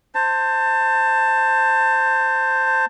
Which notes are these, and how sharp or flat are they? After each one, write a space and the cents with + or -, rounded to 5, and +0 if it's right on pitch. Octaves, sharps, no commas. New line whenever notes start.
C5 +0 A5 +25